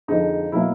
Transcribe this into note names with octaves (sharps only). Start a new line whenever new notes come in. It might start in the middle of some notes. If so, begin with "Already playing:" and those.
F2 D3 F3 G#3 D#4
B2 F#3 A#3 E4